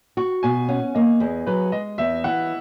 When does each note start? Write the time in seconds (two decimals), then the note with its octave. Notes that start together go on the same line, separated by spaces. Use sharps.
0.17 F#4 C#6
0.43 B2 G#5
0.68 C#4 F#5
0.95 A#3 D#5
1.20 E2 G#4
1.46 F#3 B4
1.72 G#3 D#5
1.98 E2 E5
2.24 E3 F#5